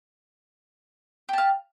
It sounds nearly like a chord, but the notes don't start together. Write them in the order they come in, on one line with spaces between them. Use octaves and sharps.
G4 A5 F5